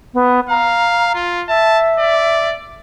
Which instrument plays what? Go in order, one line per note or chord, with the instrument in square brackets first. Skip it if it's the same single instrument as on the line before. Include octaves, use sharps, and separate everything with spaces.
[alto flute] B3
[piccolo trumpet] F5 [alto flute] A#5
[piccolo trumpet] F4
[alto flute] E5 [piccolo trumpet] A5
[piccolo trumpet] D5